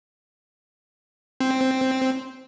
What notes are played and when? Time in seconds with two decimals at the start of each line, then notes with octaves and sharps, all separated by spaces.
1.40 C4